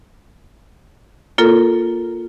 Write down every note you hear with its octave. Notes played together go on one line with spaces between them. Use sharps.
A#3 F4 A4 A#4